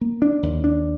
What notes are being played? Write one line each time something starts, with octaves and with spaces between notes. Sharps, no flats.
A#3
D4
D#2
D4